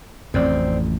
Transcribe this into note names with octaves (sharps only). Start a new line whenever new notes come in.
A1 F2 C4 D5